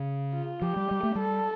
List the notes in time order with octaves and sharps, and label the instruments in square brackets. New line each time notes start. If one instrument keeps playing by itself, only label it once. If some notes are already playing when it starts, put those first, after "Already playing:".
Already playing: [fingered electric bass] C#3
[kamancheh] F4
[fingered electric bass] F3 [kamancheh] G4
[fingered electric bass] G3
G3
A3
[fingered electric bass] G3 [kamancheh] A4